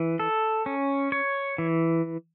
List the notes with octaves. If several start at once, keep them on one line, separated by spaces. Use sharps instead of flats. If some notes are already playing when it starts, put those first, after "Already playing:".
Already playing: E3
A4
C#4
C#5
E3